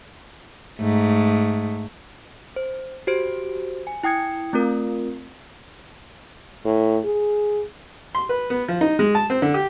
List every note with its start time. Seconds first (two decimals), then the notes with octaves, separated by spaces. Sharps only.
0.80 G#2 A3
2.56 C5
3.07 F#4 G4 C5 D7
3.87 G#5
4.03 E4 G5 D#6 G#6 C#7
4.53 A3 C4 F4 A#4
6.65 A2
7.05 G#4
8.15 C6
8.29 B4
8.50 B3
8.68 F3
8.81 D#4
8.99 G#3
9.15 A5
9.30 C4
9.42 D3
9.54 G4